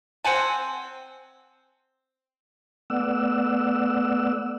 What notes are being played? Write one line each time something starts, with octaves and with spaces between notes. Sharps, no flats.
C4 F#5 G#5 A5
A3 B3 D5 F#5 E6